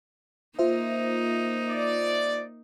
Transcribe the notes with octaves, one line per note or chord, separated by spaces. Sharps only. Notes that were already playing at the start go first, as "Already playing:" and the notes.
A#3 D#4 F4 C5 E5
D5